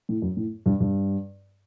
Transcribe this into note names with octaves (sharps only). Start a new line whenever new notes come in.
A2
F#2
A2
G2
G2